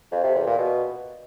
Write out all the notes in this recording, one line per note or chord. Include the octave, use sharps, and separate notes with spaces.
F2
C3
E2
A#2
B2